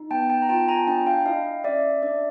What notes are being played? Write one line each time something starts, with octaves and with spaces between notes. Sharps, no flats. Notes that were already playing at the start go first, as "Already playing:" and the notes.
Already playing: D#4
B3 G5 A5
G5 A5
A#5
F4 G5 A5
G#5 A#5
D4 G5 A5
F5 G5
E4 D#5 F5
C#4 D5 E5
D4 D5 E5